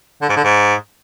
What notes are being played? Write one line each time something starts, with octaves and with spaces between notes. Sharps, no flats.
D3
G#2
D3
G#2